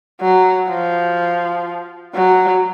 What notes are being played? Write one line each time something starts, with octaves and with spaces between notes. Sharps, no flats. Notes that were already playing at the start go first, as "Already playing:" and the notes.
F#3
F3
F#3